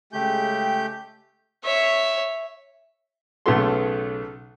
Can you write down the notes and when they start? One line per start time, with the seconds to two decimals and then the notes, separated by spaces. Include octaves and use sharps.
0.13 C#3 G#3 A3 G4 G5 G6
1.64 C#5 E5
3.46 B1 C#3 A3 B3 A4 C6